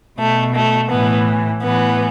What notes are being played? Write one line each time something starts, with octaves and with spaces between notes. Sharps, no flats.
B2 A3
A3
A2 E3 B3
A2 E3 B3